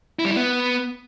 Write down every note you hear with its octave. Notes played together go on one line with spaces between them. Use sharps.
E4
G3
E4
B3